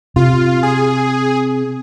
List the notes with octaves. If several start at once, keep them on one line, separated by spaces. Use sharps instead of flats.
C3 F4
G#4